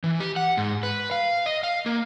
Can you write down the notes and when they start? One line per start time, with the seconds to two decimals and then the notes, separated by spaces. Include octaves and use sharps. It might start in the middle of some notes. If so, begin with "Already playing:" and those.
0.04 E3
0.20 G4
0.36 F#5
0.57 G#2
0.83 B4
1.11 F5
1.46 D#5
1.63 F5
1.86 A#3